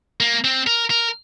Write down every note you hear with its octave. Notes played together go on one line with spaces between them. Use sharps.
A#3
C4
A#4
A#4